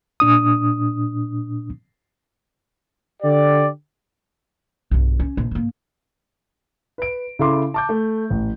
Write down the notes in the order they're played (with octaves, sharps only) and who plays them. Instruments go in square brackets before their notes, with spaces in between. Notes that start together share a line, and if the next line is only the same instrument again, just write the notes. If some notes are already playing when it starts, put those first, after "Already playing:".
[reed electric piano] A#2 D4 D#6
[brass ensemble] D3 G4 D5
[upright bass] B1 G2
C#4
A#1
G#2 A#3
[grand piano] B4 D7
C#3 E4 A4 C6 D6
A5 D6 G6
A3
A1